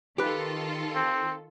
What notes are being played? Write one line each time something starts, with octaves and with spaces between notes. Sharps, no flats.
D#3 F4 G4 A4 B4
C4